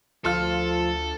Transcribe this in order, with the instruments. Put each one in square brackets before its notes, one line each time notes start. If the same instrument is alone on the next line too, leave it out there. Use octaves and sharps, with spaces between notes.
[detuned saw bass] D2 [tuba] F3 [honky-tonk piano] F4 F6 [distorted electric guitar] A4